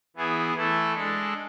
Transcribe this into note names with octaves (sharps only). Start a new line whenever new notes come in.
E3 B3 E4 G#4
E3 A3 E4 A4
G#3 D4 A4